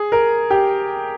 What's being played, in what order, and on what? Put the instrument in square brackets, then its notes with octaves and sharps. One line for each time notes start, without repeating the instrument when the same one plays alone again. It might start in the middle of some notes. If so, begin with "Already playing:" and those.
Already playing: [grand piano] G#4
A#4
G4